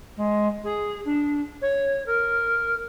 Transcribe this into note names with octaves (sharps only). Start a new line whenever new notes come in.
G#3
G#4
D4
C#5
A#4